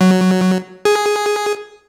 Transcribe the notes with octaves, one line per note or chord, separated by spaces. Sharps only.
F#3
G#4